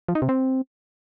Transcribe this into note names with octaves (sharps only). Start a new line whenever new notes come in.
F3
D#4
C3
C4